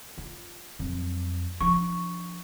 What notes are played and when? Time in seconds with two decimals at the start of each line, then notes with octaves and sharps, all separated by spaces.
0.18 F4
0.79 F2 F#3
1.61 F3 D4 C#6